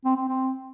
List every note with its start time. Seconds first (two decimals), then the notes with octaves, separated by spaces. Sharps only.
0.05 C4
0.16 C4
0.28 C4